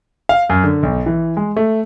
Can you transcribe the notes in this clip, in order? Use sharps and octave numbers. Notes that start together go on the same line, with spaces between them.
F5
F#2
D3
B1
E3
G#3
A3